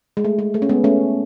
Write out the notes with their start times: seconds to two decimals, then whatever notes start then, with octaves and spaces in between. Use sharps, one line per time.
0.17 G#3
0.24 A3
0.39 G#3
0.54 A3
0.62 C#4
0.69 G#3 B3
0.84 A3 C#4